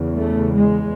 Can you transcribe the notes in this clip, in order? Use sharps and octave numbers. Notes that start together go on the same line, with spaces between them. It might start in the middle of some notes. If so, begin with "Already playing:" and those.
Already playing: E2 C#3
A3
G#3